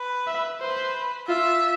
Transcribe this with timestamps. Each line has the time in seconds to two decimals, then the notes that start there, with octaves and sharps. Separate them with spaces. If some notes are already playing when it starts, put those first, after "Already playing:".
Already playing: B4
0.27 E5
0.61 B4 C5
1.28 F4 E5